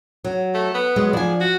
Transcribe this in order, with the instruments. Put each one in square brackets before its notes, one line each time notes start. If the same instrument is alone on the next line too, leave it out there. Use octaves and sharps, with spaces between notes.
[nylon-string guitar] F#3
[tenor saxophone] A3
B3
[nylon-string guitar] F#3 G#3
[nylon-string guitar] F3 G#5 [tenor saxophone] D4
[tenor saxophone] F#4